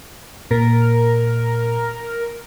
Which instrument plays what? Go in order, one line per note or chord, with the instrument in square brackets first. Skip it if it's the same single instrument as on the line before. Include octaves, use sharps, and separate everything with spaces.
[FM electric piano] A#2 [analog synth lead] A#4